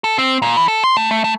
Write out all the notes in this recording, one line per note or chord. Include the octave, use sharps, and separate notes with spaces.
A4
C4
A#2
E3
A4
C6
A3
A3
A3